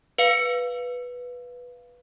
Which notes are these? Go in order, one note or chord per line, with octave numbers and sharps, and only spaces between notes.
B4 F5 C#7